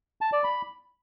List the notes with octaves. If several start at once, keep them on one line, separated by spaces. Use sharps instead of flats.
A5
D5
B5